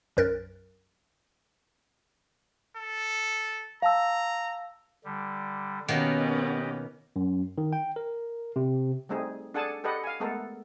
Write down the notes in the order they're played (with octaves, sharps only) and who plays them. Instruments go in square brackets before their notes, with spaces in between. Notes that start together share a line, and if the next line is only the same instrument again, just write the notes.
[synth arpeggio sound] B1 F#2 A#4 F#6 A6
[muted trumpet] A4
[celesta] F5 A5 E6 [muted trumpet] A#5
[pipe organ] D3 G3
[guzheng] B2 D#3 A#3 [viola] B3 C#4 [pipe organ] G4 D#5
[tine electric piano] F#2
D#3
G5
A#4
C3
[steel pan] G3 A3 C4 D#4 G#4
D4 G#4 A4 F#5 G#5 A5
G4 A4 B4 D#5 F#5
F5 G#5
G#3 A3 B3 A4 A#4